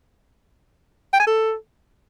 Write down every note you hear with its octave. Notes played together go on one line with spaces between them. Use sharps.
G5
G#5
A4